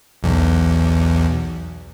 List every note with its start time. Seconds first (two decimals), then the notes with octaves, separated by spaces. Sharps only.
0.23 B1 E2